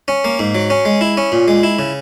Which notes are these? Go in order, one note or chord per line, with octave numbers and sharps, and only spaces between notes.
C#4
A#3
G#2
F#3
C#4
G#3
E4
C#4
A#2
G#3
E4
C#3